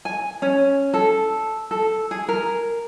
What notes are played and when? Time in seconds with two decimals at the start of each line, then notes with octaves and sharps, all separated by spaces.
0.05 G#5
0.42 C#4
0.94 A4
1.71 A4
2.11 G#4
2.28 A#4